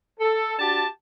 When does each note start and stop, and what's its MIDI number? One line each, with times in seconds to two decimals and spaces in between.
0.19 0.53 69
0.59 0.85 62
0.59 0.85 66
0.59 0.85 67
0.59 0.85 81